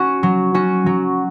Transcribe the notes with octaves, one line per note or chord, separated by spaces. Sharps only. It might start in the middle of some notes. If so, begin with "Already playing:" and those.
Already playing: C#4 F#4
F#3
C#4 F#4
F#3